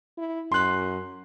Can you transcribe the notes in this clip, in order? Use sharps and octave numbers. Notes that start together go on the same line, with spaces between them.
E4
F#2 C6 F#6